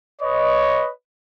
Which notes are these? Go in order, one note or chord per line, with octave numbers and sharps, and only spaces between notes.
B4 C#5 D#5